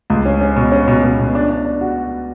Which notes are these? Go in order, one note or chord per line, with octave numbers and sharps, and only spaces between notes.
C#2
C#4
C#4
B2
C#4
B2
B2
B2
D4
D4
D4
F#4